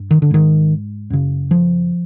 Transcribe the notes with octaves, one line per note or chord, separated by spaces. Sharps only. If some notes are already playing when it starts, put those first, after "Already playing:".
Already playing: G2
D#3
D3
G#2 D#3
F#2 C#3
F3